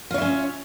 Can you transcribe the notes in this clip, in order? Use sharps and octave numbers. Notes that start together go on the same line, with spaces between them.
C#4 F4 C#5 E5